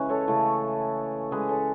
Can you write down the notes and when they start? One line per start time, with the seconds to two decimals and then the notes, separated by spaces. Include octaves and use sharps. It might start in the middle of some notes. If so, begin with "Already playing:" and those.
Already playing: C#3 E3 G#3 C#4 E4 B4
0.09 A4 C#5
0.28 C#3 E3 A3
1.31 C#3 G#3 G#4 B4
1.49 A4 C#5